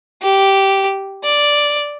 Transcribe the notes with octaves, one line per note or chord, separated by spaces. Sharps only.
G4
D5